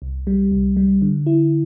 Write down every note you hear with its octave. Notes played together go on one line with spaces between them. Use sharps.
C2
G3
C2
G3
D3
E4